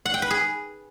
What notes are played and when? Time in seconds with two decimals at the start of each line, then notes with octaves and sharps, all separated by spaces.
0.05 F#5
0.14 G5
0.22 B4
0.30 G#4